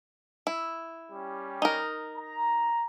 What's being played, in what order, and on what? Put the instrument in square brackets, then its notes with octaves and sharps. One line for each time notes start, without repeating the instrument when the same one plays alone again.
[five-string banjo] E4
[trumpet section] G3 C#4 G4
[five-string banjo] D#4 A#4
[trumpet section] A#5